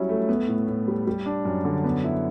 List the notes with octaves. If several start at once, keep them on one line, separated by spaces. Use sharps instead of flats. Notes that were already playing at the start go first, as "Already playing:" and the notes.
Already playing: F#3 G3 C#4 E4
A3
B3
A2
A2
G3
G3
D4
F#2
D3
B3
E4